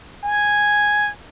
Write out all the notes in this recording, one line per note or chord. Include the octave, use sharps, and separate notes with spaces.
G#5